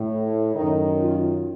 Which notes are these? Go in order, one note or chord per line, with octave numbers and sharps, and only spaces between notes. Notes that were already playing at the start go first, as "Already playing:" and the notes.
Already playing: A2
F#2 D#3 D#4
F4